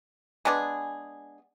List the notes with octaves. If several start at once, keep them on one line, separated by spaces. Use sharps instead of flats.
G#3 B3 D4 G#4